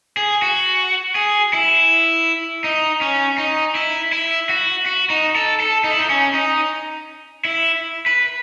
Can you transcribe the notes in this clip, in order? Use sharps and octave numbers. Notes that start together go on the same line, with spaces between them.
G#4
F#4
G#4
E4
D#4
C#4
D#4
E4
E4
F#4
F#4
D#4
A4
A4
D#4
E4
D#4
C#4
D#4
E4
B4